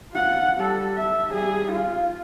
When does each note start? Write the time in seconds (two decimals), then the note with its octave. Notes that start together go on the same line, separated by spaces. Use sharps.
0.12 F4 F#5
0.57 G3 A4
0.97 E5
1.32 G3 G#4
1.72 F4